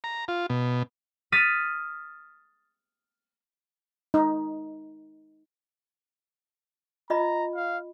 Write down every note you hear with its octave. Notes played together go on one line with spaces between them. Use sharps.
A#5
F4
B2
D#6 F6 A6 B6 D#7
D#4
F4 D#5 A#5 B5
F5